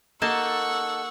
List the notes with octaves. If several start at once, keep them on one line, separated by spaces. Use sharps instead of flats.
A#3 D#4 G4 A4 F#5 A5 C#6 E6